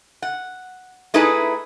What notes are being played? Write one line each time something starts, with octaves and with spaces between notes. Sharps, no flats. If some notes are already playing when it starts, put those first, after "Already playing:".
F#5
A3 D#4 E4 G#4 B4